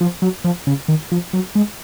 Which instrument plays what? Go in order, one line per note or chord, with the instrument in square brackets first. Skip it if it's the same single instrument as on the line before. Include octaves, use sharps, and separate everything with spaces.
[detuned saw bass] F3
F#3
F3
C#3
D#3
F3
F#3
G#3